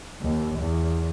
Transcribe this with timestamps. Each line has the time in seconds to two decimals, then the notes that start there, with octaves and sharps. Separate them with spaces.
0.22 D#2
0.59 E2